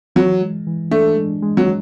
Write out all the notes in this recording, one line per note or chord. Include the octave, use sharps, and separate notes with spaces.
E3 F#3
G#3
E3
A3 D4
G#3
G#3
F#3